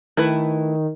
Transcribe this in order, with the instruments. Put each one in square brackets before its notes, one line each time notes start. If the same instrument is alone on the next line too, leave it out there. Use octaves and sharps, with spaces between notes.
[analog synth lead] D#3 [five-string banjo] A3 E4 B4